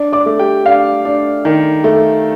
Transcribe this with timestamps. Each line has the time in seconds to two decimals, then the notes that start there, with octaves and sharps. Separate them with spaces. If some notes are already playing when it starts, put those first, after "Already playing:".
Already playing: D4
0.13 D5 D6
0.26 A3
0.39 G4 G5
0.65 D4 F5
1.05 D4
1.45 D#3
1.84 A3